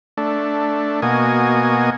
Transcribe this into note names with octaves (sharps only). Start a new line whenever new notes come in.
A3 D4
B2 A#3 F#4 D#5 G#5